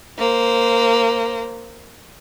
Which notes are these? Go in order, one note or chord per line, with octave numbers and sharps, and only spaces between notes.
A#3 C5